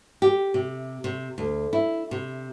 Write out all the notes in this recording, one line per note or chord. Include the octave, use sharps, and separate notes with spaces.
G4
C3
C3
D2
E4
C3